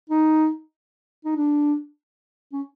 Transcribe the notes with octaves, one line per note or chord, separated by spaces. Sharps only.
D#4
D#4
D4
C#4